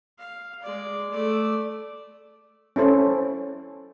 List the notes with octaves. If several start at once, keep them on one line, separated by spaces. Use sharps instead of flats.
F5
G#3 D5
A3 D5
C#4 E4 A4 C5